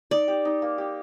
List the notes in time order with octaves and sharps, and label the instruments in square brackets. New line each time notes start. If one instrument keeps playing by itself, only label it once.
[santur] D#4 [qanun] D5
[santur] G4
D#4
A#3
G4